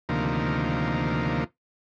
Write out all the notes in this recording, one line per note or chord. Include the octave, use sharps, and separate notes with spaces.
D2 C3 D#3 F3 A#3